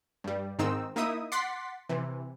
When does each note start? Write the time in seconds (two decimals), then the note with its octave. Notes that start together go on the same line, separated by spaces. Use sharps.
0.24 G2 G3
0.59 G#2 D#3 C4 D#4 E6
0.96 A#3 D#4 E4 E5 D#6
1.32 F#5 C6 D6 A6 B6 C7
1.89 C3 E3